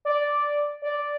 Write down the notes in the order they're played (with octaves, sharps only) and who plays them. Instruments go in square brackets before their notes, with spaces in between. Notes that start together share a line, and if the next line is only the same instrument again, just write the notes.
[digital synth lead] D5
D5